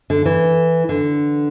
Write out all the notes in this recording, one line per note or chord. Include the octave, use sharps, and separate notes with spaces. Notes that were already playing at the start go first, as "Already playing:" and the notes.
D3
E3
D3